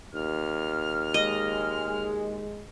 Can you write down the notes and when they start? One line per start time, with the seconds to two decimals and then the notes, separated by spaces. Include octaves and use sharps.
0.15 D#2 F6
1.14 G#3 D#5